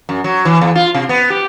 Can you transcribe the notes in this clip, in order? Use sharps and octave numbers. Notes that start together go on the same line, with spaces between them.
F#2
F#3
E3
E2
F4
C3
B3
G4